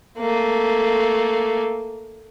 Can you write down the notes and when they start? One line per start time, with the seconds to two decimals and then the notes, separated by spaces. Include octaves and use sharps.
0.19 A3 A#3